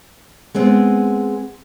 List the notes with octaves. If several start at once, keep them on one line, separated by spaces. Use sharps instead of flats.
G#3 B3 C4